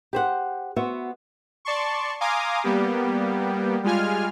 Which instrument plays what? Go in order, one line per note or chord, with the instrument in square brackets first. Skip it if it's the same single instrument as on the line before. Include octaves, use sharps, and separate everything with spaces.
[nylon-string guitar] G4 C5 F#5
B3 F#4 C5 E5
[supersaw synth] D5 A5 C6 C#6
F5 G#5 A#5 C6 D6 D#6
G3 A#3 B3 G4
G3 G#3 F4 G#5 F6